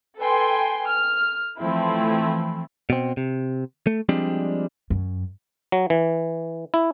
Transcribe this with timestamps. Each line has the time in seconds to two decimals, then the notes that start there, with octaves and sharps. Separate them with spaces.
0.18 A4 B4 G5 G#5 C6
0.88 F6
1.59 E3 F3 A3 C4 E4
2.90 B2 C4
3.17 C3
3.87 A3
4.09 F3 G3 G#3 C4 D4
4.90 F#2
5.72 F#3
5.90 E3
6.74 E4